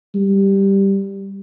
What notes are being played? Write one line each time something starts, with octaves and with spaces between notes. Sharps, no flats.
G3